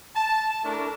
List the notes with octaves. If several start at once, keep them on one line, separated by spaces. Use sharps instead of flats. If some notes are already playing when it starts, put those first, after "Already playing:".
A5
A3 D4 E4 A#4